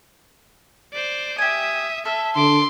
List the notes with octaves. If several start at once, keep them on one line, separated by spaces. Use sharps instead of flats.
C5 D5
G4 E5 G#5 D#6
A4 E5 F6
D3 C6 D6